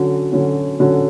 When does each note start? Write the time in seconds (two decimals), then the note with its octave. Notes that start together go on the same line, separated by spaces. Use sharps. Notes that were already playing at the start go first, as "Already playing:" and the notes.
Already playing: D3 F#3 C#4 F#4
0.32 D3 F#3 C#4 F#4
0.80 D3 F#3 C#4 F#4